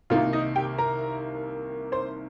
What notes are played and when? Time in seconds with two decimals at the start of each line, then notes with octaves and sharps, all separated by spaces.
0.10 C2 C3 D#3 A#3 D#4 F4 F5
0.33 D#4 D#5
0.56 G4 G5
0.78 A#4 A#5
1.92 C5 C6